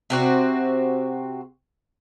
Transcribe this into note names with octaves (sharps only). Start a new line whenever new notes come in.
C3 C4 F#4